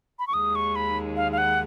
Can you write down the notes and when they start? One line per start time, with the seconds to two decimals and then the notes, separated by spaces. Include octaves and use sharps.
0.19 B5
0.27 C#6
0.34 D#2 D#3 G#3 D#6
0.55 C#6
0.76 B5
1.16 F5
1.32 F5
1.38 F#5